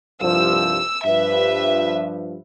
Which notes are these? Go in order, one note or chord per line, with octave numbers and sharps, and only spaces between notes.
C2 G2 F3 E6
G2 F3 B4 E5